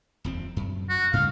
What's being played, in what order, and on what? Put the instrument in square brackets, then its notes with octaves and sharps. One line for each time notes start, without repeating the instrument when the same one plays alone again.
[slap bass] D#1 F2 C4
F#2
[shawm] F#4
[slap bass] G#2 C#3 G3 [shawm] F5